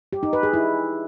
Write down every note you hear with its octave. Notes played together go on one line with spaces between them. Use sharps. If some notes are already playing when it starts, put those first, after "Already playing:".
G4
D#4
B4
G#4
E4